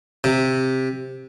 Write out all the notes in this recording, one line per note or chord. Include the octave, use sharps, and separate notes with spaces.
C3